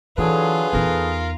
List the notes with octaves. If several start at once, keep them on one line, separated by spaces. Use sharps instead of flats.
D3 E3 F#3 F4 G#4 A4 B4
E2 D#4 A#4